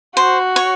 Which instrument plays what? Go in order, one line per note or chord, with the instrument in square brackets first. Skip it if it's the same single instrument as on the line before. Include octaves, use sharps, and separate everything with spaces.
[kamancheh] F#4 [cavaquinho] C5
[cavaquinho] C#5